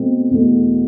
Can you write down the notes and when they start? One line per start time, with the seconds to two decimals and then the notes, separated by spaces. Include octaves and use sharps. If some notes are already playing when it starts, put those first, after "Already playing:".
Already playing: B2 A3 C4
0.31 E2 B2 A3